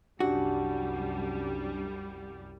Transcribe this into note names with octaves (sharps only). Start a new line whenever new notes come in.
C2 F#2 G3 C#4 D4 F#4 G4